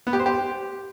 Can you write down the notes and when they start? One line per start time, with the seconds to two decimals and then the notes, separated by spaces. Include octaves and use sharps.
0.07 B3
0.13 G4
0.19 C5
0.26 G4